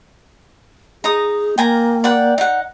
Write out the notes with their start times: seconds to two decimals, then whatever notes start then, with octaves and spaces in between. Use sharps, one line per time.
1.04 D#4 G#4 A#5 D#6
1.58 A#3 G5 G#5 A#5
2.04 D5 F#5 G5
2.38 D#4 F#5